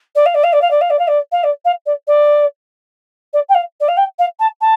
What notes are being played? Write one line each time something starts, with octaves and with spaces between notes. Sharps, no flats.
D5
F5
D5
F5
D5
F5
D5
F5
D5
F5
D5
F5
D5
F5
D5
D5
D5
G5
F5
D5
F5
G5
F5
A5
A5